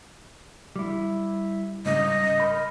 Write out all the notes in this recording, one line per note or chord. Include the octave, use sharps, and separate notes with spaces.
G3 E4
G#2 C#3 G3 D#5
A#4 B5